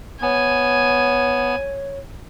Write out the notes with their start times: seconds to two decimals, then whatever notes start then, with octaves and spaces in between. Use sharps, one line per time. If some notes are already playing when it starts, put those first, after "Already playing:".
0.22 B3 C#5 G#5